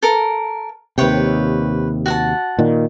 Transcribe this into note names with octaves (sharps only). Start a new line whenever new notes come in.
A4 A#4
D#2 C3 B4 C#5 G5
F#4 F#5 A5
A#2 D#3